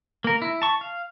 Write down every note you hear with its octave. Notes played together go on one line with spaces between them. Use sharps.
A#3 A#4
E4
A5 C#6
F5